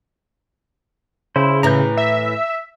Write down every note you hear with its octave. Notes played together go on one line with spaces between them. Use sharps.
C#3 E4 C5
A2 E3 A#5 G6
E5